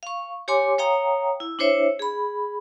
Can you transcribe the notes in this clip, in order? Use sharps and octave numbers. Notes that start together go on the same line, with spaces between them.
F5 C#6
G4 C#5 G#5 C6 D6
C#5 F5 G5 A#5 D#6
E4
D4 E4 C5 C#5 E5
G#4 B5